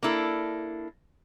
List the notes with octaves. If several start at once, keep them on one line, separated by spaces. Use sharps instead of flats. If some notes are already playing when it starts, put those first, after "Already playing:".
A#3 D4 E4 A4